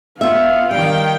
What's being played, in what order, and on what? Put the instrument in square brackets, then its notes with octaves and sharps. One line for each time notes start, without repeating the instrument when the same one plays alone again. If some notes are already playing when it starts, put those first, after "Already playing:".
[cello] B3 [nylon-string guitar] F4 E5 [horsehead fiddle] F5
[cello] D#3 G5 [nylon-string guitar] G3